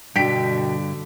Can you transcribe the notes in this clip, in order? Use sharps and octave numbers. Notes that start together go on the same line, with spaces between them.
G2 B2 D3 G5 B6 D7